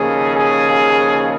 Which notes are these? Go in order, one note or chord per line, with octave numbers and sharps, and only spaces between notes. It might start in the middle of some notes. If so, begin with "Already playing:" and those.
Already playing: D#2 C#3 F3 G#4
G#4